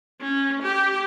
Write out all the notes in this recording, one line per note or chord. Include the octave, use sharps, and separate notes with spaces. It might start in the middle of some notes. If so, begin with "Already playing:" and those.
C#4
G4